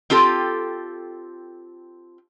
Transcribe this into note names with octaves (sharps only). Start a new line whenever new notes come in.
C4 F4 G4 A4